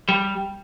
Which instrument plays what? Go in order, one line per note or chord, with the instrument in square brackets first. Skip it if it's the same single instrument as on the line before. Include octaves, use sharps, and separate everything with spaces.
[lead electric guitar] G3